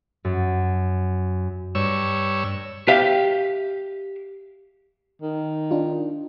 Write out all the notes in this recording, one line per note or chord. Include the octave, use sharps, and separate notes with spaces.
F#2
G2 C#5 E6
G4 E5 F5
D#3
D4 D#4 F4